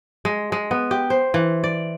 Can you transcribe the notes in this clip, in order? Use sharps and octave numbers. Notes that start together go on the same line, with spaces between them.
G#3
G#3
B3
G4
C5
E3
D5